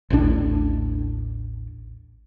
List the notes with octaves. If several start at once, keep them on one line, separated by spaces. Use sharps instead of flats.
A1 D#2 A2 D4